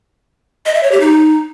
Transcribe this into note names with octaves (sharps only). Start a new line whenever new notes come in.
D#5
E5
C#5
G4
D#4